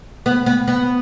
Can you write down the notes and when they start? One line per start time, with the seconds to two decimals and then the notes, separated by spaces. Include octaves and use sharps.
0.26 B3
0.46 B3
0.68 B3